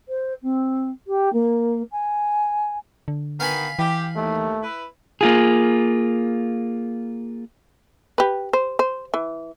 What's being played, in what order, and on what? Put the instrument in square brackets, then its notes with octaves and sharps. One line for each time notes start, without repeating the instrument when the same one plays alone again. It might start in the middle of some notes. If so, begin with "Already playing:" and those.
[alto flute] C5
C4
G4
A#3
G#5
[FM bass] D3
[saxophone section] B2 D#3 B3 [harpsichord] F5 G#5 B5
[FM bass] E3 [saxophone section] G4
[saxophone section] D#2 [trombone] A3
[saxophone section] E4 B4
[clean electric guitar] A#3 F4 G#4
[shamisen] G4 B4
C5
C5
E3